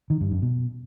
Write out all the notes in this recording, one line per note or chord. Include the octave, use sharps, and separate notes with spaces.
D#3
G2
F#2
B2